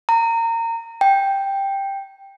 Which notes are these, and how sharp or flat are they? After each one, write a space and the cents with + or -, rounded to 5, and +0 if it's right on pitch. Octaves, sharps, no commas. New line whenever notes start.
A#5 -25
G5 +5